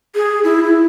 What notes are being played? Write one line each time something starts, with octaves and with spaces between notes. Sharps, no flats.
G#4
E4
E4